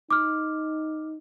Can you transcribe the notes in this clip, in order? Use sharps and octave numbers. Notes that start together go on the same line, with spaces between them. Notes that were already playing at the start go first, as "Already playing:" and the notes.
D#4 D6 F6